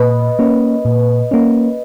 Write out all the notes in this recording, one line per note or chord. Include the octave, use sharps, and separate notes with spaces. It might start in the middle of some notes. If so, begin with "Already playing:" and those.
Already playing: A#2 B4 D#5
A#3 C#4
A#2
A#3 C#4